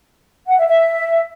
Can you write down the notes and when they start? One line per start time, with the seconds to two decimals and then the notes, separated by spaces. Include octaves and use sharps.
0.47 F#5
0.58 E5
0.68 E5